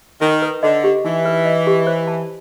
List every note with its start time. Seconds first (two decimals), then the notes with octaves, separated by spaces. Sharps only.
0.21 D#3 D#4
0.42 B4
0.63 D3 D#5
0.84 G4
1.05 E3 D#4
1.25 B4
1.45 D#5
1.67 G4
1.87 C5
2.07 A5